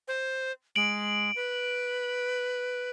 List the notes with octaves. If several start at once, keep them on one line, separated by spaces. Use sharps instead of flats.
C5
G#3 D7 F#7
B4